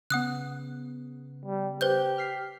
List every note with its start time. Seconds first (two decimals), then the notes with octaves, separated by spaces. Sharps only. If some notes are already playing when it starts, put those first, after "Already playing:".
0.10 C#3 B3 F#5 D#6 F#6
1.45 G3
1.81 G4 B4 C5 G6
2.18 F6 B6 C7